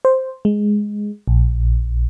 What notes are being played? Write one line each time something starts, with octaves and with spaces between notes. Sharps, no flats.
C5
G#3
A#1